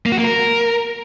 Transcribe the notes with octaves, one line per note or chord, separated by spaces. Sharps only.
A#3
F#4
A#3
A#4